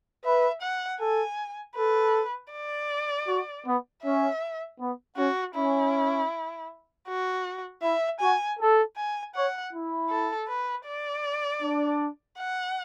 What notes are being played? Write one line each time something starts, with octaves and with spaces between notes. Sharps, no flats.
B4 E5
F#5
A4 G#5
A4 B4
D5
F#4
B3
C#4 E5
B3
C#4 F#4
C#4 E4
F#4
E4 E5
F#4 G#5
A4
G#5
C#5 F#5
E4
A4
B4
D5
D4
F#5